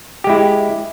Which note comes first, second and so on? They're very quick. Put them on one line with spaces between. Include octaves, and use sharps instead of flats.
G4 G#3 E4